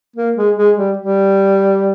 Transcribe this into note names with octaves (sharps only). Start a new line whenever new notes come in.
A#3
G#3
G#3
G3
G3